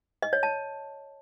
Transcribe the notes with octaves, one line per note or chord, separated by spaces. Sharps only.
D#5
C#5
A5